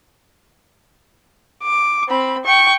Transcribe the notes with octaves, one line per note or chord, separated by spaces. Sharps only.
D6
C4 B5
G5 C#6